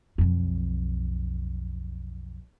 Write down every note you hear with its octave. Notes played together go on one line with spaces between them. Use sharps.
B1 F2